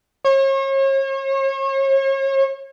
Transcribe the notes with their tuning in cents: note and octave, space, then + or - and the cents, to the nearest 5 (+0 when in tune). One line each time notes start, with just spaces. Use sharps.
C#5 -40